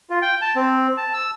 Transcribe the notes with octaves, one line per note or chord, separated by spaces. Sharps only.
F4
G5
A5
C4
A5
E6